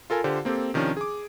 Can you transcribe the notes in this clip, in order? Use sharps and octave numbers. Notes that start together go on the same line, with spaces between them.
F4 A4 A#4 G#5
D3 F4 G4 C5
A#3 C4 G4 A4
C3 D#3 F3 C#4 D4
G#4 D6